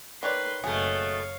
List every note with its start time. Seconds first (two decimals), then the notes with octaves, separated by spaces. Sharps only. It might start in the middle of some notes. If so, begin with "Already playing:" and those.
0.23 D#3 B4 C#5 D5 C6
0.64 F#1 B2 A3 G#4 C#5 F5